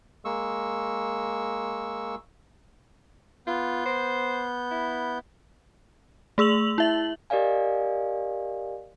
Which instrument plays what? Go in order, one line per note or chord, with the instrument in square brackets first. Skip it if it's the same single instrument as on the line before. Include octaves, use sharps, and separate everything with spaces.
[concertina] G#3 A#3 C#6 E6
[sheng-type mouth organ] B3 G6 [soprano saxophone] F4
[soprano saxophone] C5
E4
[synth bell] A3 G#4 E6 F7 F#7
E4 E5 F#7
[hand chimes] G4 A#4 D5 D#5 F5 G#5